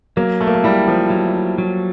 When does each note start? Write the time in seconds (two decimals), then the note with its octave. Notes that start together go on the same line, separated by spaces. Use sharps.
0.17 F#3 A#3
0.40 A3
0.47 A#3
0.55 A3
0.64 G3 E4
0.88 F3
1.10 F#3
1.58 F#3